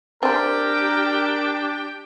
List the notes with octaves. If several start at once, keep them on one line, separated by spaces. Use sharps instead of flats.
C4 D4 G4 A#4 C5 G5